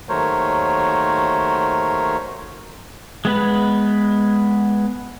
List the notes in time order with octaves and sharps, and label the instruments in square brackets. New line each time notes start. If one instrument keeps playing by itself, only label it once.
[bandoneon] D#2 F#3 A3 A#4 C5 C#5
[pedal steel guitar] G#3 B3 B4